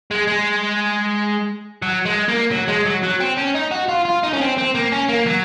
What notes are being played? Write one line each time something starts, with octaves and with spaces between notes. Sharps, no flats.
G#3
G#3
F#3
G#3
A#3
F#3
G#3
F#3
F#3
C4
C#4
D#4
F#4
F4
F4
D#4
C#4
C4
C4
A#3
C#4
A#3
F#3